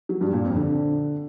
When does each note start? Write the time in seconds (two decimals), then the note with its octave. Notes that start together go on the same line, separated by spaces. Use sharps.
0.09 F#3
0.21 G2
0.33 A#2
0.45 F2
0.56 D3